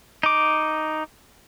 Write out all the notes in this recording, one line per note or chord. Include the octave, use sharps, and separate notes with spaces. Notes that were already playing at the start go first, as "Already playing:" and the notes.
D#4 D6